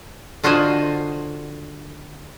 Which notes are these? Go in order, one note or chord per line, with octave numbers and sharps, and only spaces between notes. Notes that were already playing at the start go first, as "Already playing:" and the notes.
D3 F4 F#4 C5 D#5 G#5